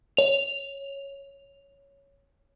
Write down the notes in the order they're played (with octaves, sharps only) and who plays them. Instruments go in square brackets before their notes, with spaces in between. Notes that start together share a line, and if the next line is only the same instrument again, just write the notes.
[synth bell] C#5 F7